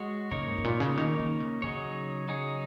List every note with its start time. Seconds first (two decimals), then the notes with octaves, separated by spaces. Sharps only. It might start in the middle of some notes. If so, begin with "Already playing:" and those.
Already playing: G#3 F#4 C#5
0.31 C#3 A#3 D#4 A#4 C#5
0.47 G#2
0.58 G#2
0.64 A#2
0.80 C#3
0.97 D#3 A#3 D#4 A#4 C#5
1.19 D#3
1.40 C#3
1.62 C#3 F#3 D#4 G#4 C#5
2.28 F#3 D#4 G#4 C#5